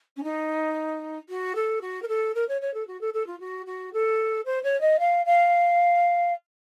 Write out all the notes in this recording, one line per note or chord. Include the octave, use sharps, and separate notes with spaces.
C#4
D#4
F#4
A4
F#4
A#4
A4
A#4
C#5
C#5
A4
F#4
A4
A4
F4
F#4
F#4
A4
C5
C#5
D#5
F5
F5